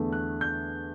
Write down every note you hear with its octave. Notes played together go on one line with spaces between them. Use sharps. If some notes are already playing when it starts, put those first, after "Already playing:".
Already playing: E2 D3 A3
F#6
G6